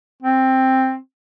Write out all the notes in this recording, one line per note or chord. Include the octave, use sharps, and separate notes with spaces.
C4